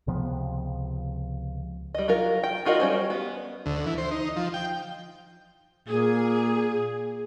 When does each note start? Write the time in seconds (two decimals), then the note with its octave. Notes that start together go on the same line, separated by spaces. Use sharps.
0.07 C#2 C3 F3 B3
1.95 G3 D#5
2.08 F#3 F4 A#4
2.44 G5
2.65 D#4 F4 F#4 A#4 D#5
2.80 G3 C#4 C5
3.10 B3
3.66 D2
3.86 E3
3.98 C5
4.11 D#4
4.36 F3
4.54 G5
5.88 A#2 G#4